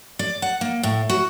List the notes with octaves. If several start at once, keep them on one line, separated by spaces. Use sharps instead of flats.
D5
F#5
A#3
A2
F#4